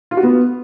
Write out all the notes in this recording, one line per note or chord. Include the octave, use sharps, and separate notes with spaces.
F4
F#4
B3